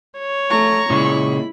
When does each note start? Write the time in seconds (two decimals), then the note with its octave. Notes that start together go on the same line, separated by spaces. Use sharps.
0.18 C#5
0.50 A3 A#5 C#6
0.90 A#2 C#3 G#3 E4 B5